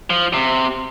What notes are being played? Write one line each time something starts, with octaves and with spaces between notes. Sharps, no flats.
F3
C3